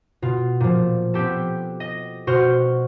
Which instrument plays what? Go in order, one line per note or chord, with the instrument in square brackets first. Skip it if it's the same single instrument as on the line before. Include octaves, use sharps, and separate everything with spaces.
[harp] B2 F4
A#2 F3
B3 C4 G4 A4
D#5
B2 F#4 C5 C6 F6